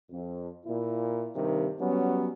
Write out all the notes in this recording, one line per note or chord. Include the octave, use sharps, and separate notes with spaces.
F2
A#2 E4
G2 C3 D#3
F#3 G3 B3 C#4